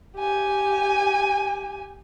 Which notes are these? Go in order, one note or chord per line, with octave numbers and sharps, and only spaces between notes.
G4 G#5